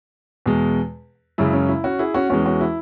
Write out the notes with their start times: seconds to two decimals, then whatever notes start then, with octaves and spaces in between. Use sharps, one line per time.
0.46 E2 B2 G#3
1.38 F#2 C#3 G#3 E4
1.53 C#4
1.69 E4
1.84 C#4 F#4
1.99 E4 G#4
2.14 C#4 F#4
2.30 E2 E3 G#3 C#4 F#4
2.45 C#4 F#4
2.61 E4